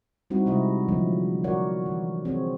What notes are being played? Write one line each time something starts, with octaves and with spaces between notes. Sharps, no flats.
G3 C4 D#4 E4 F#4
C3 G#3 E4 D#5 E5
D3 F3 F#3 A#3 D4
F#4 A#4 C#5 D5 F#5
E3
C4 G#4 C#5